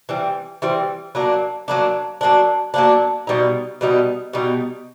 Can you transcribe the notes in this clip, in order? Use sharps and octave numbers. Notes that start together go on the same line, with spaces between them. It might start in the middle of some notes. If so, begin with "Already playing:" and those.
E3 G3 C4
E3 G3 C4
F#3 A#3 D4
F#3 A#3 D4
F#3 A#3 D4
F#3 A#3 D4
B2 G3 B3 D#4
B2 G3 B3 D#4
B2 G3 B3 D#4